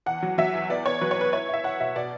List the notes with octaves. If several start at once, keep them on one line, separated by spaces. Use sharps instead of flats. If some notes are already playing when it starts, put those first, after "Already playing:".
E2 F#5
F#3
F#3 E5
E2
B3 D5
B3 C#5
F#3 B4
C#5
B3 B4
E4 C#5
E4 E5
E4 F#5
B2 E5
B2 D5